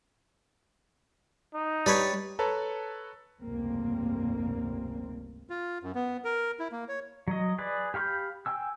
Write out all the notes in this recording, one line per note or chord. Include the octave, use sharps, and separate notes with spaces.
D#4
G3 D4 B4 C#5
A4 B4 C#5 A5 A#5
F1 C#2 G2 A#3 C4
F4
F#2
B3
A#4
E4
A#3
C#5
F#3 D#5
G#4 B4 D5
G4 F5 B5 C#6 G6
G5 G#5 E6